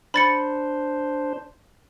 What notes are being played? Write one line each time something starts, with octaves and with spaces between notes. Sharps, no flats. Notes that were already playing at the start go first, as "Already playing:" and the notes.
D4 C5 B5 A6 C#7